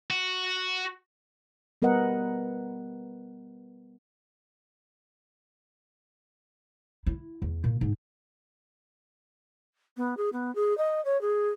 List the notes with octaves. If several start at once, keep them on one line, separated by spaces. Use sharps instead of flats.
F#4
G3 B3 A#4 B4 D#5 F#5
E4
E2
A#2
G#2
B3
G#4
B3
G#4
D#5
C#5
G#4